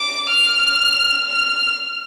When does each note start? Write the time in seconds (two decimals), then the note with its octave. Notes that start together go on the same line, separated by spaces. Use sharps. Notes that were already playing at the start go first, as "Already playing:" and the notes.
Already playing: D6
0.30 F6
1.27 F6